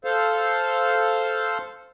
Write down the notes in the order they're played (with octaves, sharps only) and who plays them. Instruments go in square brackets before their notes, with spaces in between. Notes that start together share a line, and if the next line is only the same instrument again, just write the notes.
[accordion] A4 C5 F5